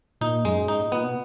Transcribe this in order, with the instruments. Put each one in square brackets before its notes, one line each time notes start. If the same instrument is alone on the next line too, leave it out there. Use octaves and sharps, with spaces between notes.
[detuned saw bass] A#2 [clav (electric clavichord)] D#4
[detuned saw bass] F#2 [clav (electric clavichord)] G#3
[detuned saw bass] G#2 [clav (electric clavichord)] D#4
[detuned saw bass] A#2
[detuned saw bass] A#2 [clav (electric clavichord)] B3
[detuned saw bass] B2